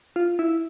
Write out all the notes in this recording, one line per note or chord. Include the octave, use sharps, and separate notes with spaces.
F4
E4